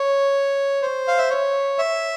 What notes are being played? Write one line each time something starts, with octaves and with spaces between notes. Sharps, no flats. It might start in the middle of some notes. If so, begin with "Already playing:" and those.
Already playing: C#5
C5
F5
E5
C#5
E5